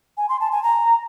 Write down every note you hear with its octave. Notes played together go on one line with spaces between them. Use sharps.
G#5
C6
A5
G#5
A#5